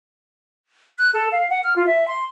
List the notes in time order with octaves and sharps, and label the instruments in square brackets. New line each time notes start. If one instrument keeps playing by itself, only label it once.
[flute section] F#6
A4
F5
F#5
F6
F4
E5
C6